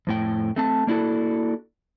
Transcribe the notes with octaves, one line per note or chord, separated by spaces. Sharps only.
F2 A2 G5
A3 C4 A5
A#3 D4 E4 F#4 A4